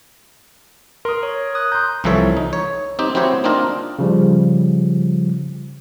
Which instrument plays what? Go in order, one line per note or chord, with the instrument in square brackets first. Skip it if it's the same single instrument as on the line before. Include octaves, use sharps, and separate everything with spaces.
[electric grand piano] A#4 D#6 [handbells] C6
[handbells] C#5
D#6 F#6
[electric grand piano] A#5 C6 [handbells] G6
[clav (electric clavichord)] C2 E3 F3 A4 C#5 E5
D#4
C#5
C4 D#4 G4
C4 E4 F#4 G4 C5 C#5
A#3 C4 D4 D#4 F4 A#4
[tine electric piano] C#3 F3 G3